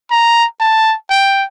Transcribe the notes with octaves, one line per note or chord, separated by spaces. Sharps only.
A#5
A5
G5